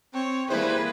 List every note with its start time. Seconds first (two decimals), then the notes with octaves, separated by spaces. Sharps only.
0.14 C4 C#5
0.50 E3 G3 A#3 E4 G#4 B4 C5